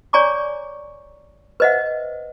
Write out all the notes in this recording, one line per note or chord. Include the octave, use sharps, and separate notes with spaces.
C#5 D5 G#5 A#5 C#6 D6
B4 C5 D#5 E5 F#5